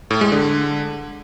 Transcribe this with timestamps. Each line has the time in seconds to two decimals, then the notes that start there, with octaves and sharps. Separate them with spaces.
0.11 A2
0.21 G#3
0.32 D3